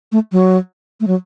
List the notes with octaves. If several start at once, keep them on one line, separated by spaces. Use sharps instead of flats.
A3
F#3
A3
F#3